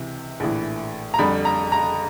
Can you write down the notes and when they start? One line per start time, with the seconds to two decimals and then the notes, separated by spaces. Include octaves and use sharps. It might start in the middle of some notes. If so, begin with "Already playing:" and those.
Already playing: C#2 C3 E3
0.40 A#1 A2 E3
1.14 A#5
1.19 F2 D3 G3 B5
1.45 A#5
1.72 A#5